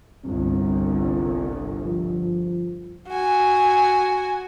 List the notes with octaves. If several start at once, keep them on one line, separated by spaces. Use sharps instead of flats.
G1 C2 C4
F3
F#4 G#5